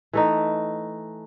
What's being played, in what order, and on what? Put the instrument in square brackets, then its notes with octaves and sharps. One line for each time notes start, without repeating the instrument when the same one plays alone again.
[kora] E3 A3 D#4